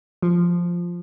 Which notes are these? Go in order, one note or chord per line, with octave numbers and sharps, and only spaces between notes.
F3